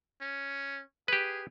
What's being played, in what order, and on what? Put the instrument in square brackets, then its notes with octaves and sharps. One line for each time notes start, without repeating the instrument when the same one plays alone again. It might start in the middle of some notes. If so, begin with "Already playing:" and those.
[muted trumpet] C#4
[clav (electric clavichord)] G4 B4 [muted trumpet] G#4